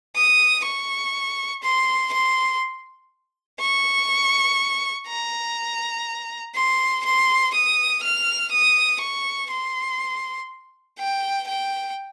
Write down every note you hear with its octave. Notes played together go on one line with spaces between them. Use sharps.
D#6
C#6
C6
C6
C#6
A#5
C6
C6
D#6
F6
D#6
C#6
C6
G5
G5